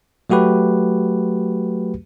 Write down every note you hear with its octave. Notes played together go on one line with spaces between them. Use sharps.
F#3 A3 F#4 G4 B4